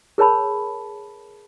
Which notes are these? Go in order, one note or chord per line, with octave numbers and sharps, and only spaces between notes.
G#4 A#4 C#5 A5 B5